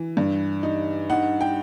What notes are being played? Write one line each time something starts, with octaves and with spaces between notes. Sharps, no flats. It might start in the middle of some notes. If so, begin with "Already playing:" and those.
Already playing: E3
G2
D#4
D#4 F#5
G5